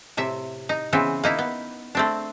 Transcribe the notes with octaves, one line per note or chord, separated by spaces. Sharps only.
A2 C3 E5
D#4
C#3 E3 B3 C4
A#3 D#4 E4
B3
A3 C4 D4